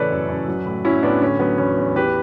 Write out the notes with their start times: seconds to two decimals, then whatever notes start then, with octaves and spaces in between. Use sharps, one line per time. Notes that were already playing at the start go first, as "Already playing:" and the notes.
Already playing: A2 C#3 E3 A4 B4 C#5 D5
0.11 F#2
0.29 F#2
0.48 F#3
0.66 A2
0.85 F#3 C#4 E4
1.03 A2 B3 D4
1.21 D3 C#4
1.40 F#3 B3
1.58 E2 C#4
1.77 E2
1.96 E3 G4 B4